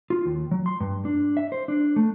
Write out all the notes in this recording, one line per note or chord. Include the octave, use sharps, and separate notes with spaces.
F4
D#2
F#3
C6
G2
D4
E5
C5
D4
A3